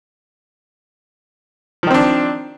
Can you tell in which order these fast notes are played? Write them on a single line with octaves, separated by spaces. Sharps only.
F3 D#3 C4 D4